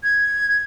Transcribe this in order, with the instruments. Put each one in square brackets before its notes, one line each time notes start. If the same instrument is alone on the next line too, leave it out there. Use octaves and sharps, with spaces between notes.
[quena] G#6